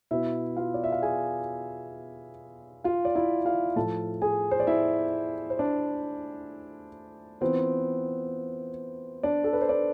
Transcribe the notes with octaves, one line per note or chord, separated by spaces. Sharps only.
B2 B3 E4 E5
F4 F5
D5
E5
F5
G#4 G#5
F4 F5
D5
E4 E5
F4 F5
A2 F3 A3 A4 A5
G#4 G#5
C5
D5
E4 E5
C5
D4 D5
E3 B3 C4 F4 C5
D4 D5
A4
B4
C5
D4 D5